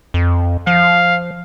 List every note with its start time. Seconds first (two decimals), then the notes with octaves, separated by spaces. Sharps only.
0.14 F2
0.67 F3 F5